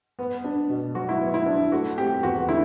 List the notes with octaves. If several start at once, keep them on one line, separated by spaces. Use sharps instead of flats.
B3
D4
B2
F#3 F#4
E4
B3
E4
D4
A3 F#4
C4 G4
E2 F#4
D3 E4